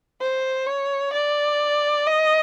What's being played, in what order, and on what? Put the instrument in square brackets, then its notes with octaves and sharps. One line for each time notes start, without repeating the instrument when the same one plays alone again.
[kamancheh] C5
C#5
D5
D#5